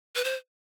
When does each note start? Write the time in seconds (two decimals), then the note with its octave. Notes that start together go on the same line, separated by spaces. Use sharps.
0.16 B4
0.24 C5